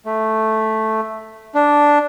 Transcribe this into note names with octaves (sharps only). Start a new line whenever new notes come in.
A3
D4